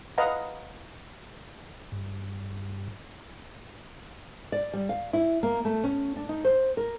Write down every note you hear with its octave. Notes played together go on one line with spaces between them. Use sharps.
B4 D#5 F5 F#5 A#5
G2
D5
G3
F5
E4
A#3
A3
C#4
D4
D#4
C5
A#4